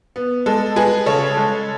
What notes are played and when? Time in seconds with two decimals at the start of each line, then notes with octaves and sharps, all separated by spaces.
0.16 B3
0.46 G#3 A4
0.76 G#3 G#4 B4
1.06 C#3 A4 C#5
1.37 G#3